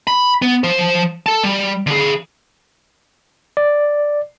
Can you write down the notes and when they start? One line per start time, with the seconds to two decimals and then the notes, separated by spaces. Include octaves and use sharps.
0.07 B5
0.42 B3
0.64 F3 C5
1.26 A4 A5
1.44 G3
1.87 D3 G#4
3.57 D5